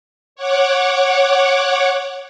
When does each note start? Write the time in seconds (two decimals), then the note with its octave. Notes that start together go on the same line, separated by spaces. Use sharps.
0.36 C#5 F#5 D6